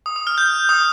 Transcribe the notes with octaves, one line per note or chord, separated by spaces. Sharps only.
D#6
D#6
F6
G6
D#6